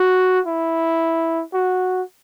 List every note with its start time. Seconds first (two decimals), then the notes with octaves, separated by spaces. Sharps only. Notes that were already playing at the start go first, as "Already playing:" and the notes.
Already playing: F#4
0.46 E4
1.54 F#4